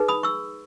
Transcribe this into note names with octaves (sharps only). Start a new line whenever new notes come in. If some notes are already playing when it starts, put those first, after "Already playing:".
Already playing: D#4 G#4 B4
B5 D#6
C#6 E6